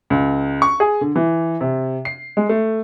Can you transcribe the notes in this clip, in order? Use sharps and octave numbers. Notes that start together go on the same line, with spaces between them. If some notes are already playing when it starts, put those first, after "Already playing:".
C#2
C#6
G#4
D3
E3
C3
C7
G#3
A3